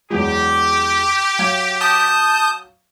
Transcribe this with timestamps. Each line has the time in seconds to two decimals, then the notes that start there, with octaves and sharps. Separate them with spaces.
0.10 E2 F#3 G#3 G4
1.39 F#3 F5 G#6
1.81 A5 D#6 G6